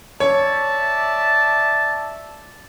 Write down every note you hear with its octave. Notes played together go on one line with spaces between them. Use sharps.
C#5 D5 E5 A5